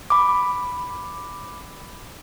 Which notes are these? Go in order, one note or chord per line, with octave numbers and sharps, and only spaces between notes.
B5 D6